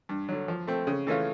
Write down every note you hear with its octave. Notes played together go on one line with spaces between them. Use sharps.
G2
D3 F#3
F3
A3 C4
C#3
E3 A3 C#4 F4